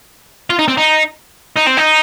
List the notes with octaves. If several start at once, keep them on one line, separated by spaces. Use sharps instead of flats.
F4
D#4
C4
D#4
D#4
C4
D#4